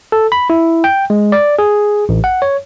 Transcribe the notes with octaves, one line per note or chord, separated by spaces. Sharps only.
A4
B5
E4
G5
G#3
D5
G#4
A1
F#5
C#5